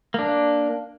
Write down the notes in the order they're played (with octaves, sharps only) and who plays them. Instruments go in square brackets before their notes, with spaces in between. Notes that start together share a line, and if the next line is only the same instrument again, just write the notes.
[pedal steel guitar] A#3 D4